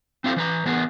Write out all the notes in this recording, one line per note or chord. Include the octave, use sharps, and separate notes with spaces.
C4 E4 F4 G4 A4 C5
E3 B4 A#5
E3 B3 G#4 A#4 B4